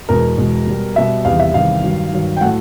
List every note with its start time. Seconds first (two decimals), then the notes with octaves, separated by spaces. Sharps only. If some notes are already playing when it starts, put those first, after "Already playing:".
0.09 E2 B2 G#3 A#4
0.38 E2 B2 G#3
0.67 B2 G3
0.96 B2 G3 E5
1.25 E2 C3 D#3 G3 F5
1.40 E5
1.54 E2 C3 D#3 G3 F5
1.84 G2 D#3 F#3
2.12 G2 D#3 F#3
2.37 G5
2.41 A2 F#3 A3 F#5